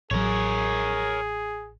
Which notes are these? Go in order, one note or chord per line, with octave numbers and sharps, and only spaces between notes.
A1 F#3 G#4 A#4 C#5